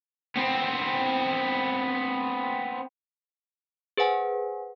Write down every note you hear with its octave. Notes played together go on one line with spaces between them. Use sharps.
B3 C4
G#4 B4 C5 F#5 G#5